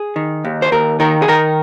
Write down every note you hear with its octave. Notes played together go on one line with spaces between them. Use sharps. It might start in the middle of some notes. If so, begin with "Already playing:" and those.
Already playing: G#4
D#3
D#2
C5
D#2 A#4
D#3 A#4
G#4
D#3 A#4